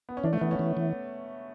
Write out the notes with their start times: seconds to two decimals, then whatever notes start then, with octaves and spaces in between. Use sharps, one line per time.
0.09 B3
0.17 C#4
0.24 E3 D4
0.33 A3
0.41 E3 B3
0.51 C#4
0.59 E3
0.77 E3